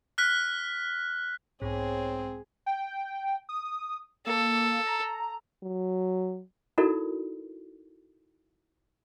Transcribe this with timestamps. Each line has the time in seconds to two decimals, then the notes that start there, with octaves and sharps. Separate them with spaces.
0.18 F6 F#6 B6
1.62 B1 G#2 C4 G#4 C#5
2.66 G5
3.49 D#6
4.27 A#3 A4
4.86 A#5
5.63 F#3
6.78 D#4 E4 F#4 A4 A#4 D5